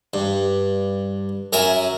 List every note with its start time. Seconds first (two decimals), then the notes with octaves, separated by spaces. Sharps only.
0.14 G2
1.53 F#2 A#4 E5 G#5